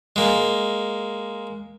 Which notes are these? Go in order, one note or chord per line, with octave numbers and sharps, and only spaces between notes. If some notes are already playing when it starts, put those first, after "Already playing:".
G#3 A#3